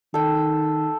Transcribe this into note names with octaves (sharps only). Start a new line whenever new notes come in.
D#3 A4 G5